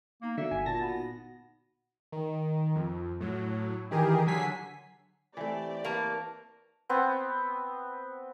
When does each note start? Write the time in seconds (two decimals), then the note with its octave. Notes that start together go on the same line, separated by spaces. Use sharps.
0.22 A#3 B3 D#4 A#5
0.37 D3 F#4 E5
0.51 G1 G#5
0.66 A#2 A5 A#6
0.81 B3 F#4 B5
0.95 D#4
2.12 D#3
2.76 F2
3.20 A2 F#3
3.91 D#3 E3 G4 G#4 A#4
4.27 D3 F#3 G#5 B6 C7
5.37 E3 A3 C4 G4 D5
5.85 A#3 B4 C#5 A5
6.90 B3 C4